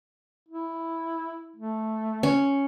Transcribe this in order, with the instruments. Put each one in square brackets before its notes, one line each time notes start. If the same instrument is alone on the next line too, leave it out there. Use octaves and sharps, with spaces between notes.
[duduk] E4
A3
[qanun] C#4